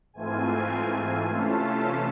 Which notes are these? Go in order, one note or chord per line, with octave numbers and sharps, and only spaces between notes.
G#2 E3 A3 C4 F4 G#5
C3 E3 A3 C#4 F4 A5